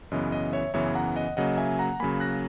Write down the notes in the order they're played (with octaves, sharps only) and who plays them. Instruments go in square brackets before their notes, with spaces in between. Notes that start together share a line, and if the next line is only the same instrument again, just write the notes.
[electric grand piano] F#2 C#3 E3 B3 D#5
D#5
C#5 E5
F#2 C#3 E3 B3 C#5 E5
F#5 A#5
D#5 F#5
C#3 F#3 A#3 D#5 F#5
E5 G#5
F#5 A#5
C#3 F#3 A#3 G#5 B5
F#6 A#6